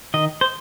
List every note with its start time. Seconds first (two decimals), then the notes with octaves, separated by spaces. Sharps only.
0.14 D#3 D#5
0.41 C5